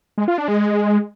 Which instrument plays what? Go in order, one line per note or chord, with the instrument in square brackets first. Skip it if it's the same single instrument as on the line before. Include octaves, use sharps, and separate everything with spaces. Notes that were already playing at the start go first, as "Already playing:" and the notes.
[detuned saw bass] G#3
F4
D4
G#3